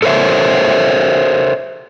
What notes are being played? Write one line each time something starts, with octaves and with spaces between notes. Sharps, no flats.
A4 A#4 C5 C#5 E5